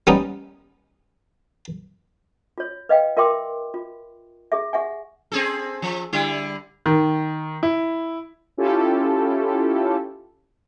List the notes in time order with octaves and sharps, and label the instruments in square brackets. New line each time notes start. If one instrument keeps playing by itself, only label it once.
[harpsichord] G3 B3 C#4 D#4
[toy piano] F4 C#5
B4 D#5 F5 G5
F4 A#4 E5 G5 C6 D6
F4
G4 G#4 E5
G4 E5 F#5 G#5
[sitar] C4 G#4 A4
F3
D3 G3 E4
[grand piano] D#3
E4
[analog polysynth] C#4 E4 F4 G4 A4